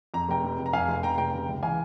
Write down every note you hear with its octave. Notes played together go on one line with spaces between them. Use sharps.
F2 A#5
F1 G5 A#5
C3
F1
A#5
F2 F5 G#5
F1
C3 G5 A#5
F1 G5 A#5
C#3
C#2
E3 F5 G#5